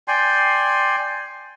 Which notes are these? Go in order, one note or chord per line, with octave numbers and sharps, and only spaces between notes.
D5 G5 G#5 C6